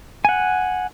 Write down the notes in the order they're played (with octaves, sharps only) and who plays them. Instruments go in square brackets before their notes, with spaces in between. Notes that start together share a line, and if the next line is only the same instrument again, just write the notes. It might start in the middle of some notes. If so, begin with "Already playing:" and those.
[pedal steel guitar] F#5 G#5